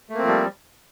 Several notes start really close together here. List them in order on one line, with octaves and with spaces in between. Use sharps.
A3 A#3 C4 F3 G3